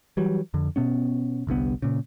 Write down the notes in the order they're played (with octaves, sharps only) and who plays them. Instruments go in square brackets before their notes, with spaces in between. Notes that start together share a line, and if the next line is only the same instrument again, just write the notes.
[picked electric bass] E3 F#3 G3
F2 D3
B2 B3 C#4
G1 C2 G2 B3
A#2 C#3